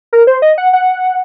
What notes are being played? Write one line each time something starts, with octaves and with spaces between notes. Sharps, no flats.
A#4
C5
D#5
F#5
F#5